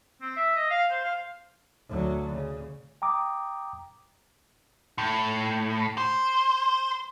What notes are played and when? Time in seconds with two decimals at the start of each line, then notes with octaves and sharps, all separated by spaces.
0.21 C4
0.37 E5
0.56 D#5
0.70 F5
0.91 C5
1.04 F5
1.89 D2 F#3
2.32 C#3
3.02 G5 A#5 D6 D#6
4.98 A2
5.98 C5